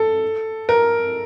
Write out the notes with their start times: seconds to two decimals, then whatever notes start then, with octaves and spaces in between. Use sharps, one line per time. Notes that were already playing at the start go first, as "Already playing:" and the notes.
Already playing: A4
0.69 A#4